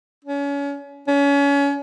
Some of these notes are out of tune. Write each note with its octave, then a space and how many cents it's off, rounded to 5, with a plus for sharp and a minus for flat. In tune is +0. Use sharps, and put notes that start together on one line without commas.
C#4 +30
C#4 +30